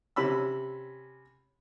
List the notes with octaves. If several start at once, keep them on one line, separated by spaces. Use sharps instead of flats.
C3 C#4 B5 E6